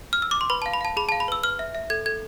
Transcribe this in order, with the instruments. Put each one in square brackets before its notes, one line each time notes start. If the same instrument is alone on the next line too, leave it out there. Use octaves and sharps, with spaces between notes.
[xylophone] F6
E6
D6
C6
B4 B5
F5 A5
B5
F5 A5
G#4 B5
F5 A5
B5
B4 E6
B4 F6
E5
E5
A4 G#6
A4 G#6